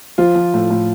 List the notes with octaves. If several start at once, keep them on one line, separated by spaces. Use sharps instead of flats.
F3 F4
F3
A2
A2